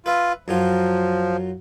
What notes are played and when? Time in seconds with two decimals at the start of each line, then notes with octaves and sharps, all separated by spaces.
0.06 F4 B4 E5
0.48 F#2 F3 F#3 F4